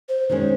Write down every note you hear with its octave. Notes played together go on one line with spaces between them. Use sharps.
C5
D#3 G#3 C#4 C5